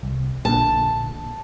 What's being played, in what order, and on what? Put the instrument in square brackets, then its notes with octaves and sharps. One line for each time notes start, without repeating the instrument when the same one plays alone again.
[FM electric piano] C2
[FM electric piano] A#1 A#2 D3 [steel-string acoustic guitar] A5